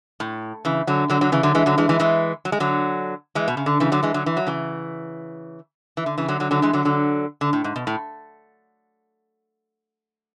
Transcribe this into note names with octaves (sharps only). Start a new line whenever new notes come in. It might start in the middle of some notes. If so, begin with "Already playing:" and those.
A2
C#3 E3
D3 F#3
D3 F#3
D3 F#3
C#3 E3
D3 F#3
E3 G#3
D3 F#3
E3 G#3
E3 G#3
E3 G#3
F#3
G#3
D3 F#3
E3 G#3
B2
C#3
D3
C#3 E3
D3 F#3
E3 G#3
D3 F#3
E3
F#3
C#3 E3
E3
D3
C#3 E3
D3 F#3
D3 F#3
D3 F#3
E3 G#3
D3 F#3
D3 F#3
D3
A2
G#2
B2
A2